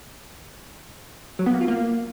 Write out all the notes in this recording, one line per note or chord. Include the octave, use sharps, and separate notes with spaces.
F#3
B3
A#3
F4
A#3